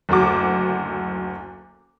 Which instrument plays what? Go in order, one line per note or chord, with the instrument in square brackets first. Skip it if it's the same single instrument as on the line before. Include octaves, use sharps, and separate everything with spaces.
[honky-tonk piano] F#1 D2 F#4 D6